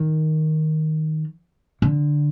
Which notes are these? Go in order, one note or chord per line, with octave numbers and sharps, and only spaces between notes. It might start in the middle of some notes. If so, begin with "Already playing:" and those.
Already playing: D#3
D3